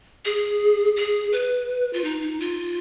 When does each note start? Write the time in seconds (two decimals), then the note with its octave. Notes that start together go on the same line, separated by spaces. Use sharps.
0.25 G#4
0.97 G#4
1.33 B4
1.93 F4
2.04 D#4
2.22 D#4
2.40 F4